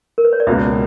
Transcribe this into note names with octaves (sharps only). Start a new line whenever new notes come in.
A#4
B4
C#5
D5
C#2 B2 A#3 E5